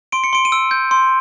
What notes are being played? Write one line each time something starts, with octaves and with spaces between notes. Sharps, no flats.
C6 D7
C#7
C6 D7
D#7
E6 D7
G6
C6